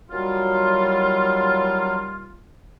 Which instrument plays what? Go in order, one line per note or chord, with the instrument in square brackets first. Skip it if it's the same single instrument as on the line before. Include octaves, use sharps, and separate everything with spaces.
[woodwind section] D#2 G3 F4 [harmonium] F#3